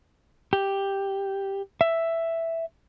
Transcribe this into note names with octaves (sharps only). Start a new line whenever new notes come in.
G4
E5